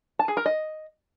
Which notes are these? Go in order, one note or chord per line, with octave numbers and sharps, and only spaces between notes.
A5
G#4
A#4
D#5